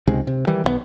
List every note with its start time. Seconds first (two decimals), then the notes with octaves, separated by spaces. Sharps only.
0.07 C#2 C3 D#3 G#3
0.27 C3
0.47 D#3 E3 G3
0.64 B1 D#3 B3